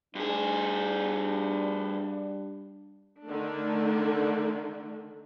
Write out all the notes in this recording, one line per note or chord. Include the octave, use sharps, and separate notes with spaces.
G2 G3 D4 G#4
D3 D#3 A3 D4